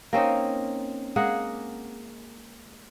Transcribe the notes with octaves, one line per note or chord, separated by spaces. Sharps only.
A#3 C4 C#4 D#4
G#3 A#3 G#4 F#5